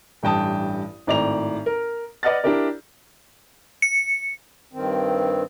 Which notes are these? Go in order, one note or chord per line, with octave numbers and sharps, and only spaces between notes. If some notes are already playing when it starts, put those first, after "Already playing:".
A1 G2 G5 A5 D#6
G#1 A2 D5 A#5 F7
A#4
B4 D5 D#5 F#5 F6 A6
D4 E4 G4 A#4 D5
C#7
G2 D#3 C4